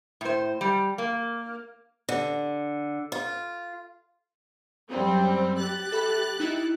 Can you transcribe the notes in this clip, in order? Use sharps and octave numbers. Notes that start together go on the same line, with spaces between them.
A2 C5
G3
A#3
D3
F4
F#2 G3 C4
G4 F#6 A6
A4 E5 B5
D#4 E4